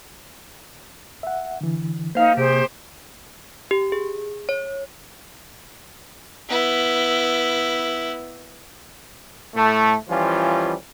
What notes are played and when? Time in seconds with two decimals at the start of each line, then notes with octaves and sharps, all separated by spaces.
1.23 E5 F#5
1.61 D3 E3
2.15 A#3 D#4 C5 F5
2.37 C3 G4 G#4 C5
3.71 G4
3.92 G#4
4.49 C#5
6.48 B3 E4
9.55 A2 A3
10.09 E3 F3 G3 C#4 F4